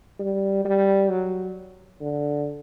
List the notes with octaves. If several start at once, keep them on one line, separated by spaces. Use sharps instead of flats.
G3
G3
F#3
D3